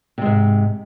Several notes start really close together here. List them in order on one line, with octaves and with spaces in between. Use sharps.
C3 G#3 G#2